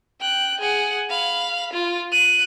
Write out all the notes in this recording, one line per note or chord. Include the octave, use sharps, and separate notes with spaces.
G5 F#6
G#4 F#5
F5 B5
F4
F#6 D#7